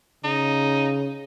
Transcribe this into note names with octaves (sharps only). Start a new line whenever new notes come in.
C#3 D#4